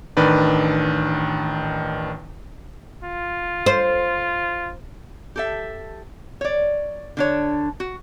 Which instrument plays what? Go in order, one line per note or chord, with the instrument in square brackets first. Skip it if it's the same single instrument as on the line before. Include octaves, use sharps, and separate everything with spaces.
[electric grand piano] A1 D#3 D4 B4 D5
[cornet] F4
[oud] C5
[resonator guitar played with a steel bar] G4 A4 E5
C#5 D5
D3 D4 C#5
F#4